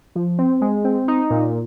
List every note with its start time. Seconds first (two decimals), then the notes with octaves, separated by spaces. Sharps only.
0.15 F3
0.38 C4
0.61 G#3
0.84 C4
1.08 D#4
1.30 A#2